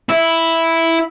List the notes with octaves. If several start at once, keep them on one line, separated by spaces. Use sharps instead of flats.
E4